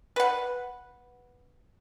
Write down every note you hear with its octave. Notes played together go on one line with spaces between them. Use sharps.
B4 F#5